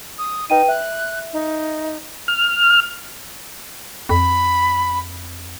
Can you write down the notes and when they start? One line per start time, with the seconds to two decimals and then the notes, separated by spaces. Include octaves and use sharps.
0.18 D#6
0.50 D#4 B4 G5 D#7
0.68 E5 F#6
1.33 D#4
2.28 F6
4.09 F2 B5